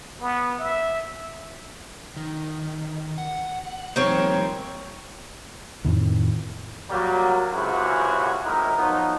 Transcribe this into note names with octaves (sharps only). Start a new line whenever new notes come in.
B3
E5
D#3
F#5
D#3 F3 G3 A#3 C4 C#5
F2 A2 D#3
F#3 G3 A#3
C#2 F#2 C3 G#3 E4 F#4
G#1 A2 D#4 E4 A#4
F3 F#3 B3 D#4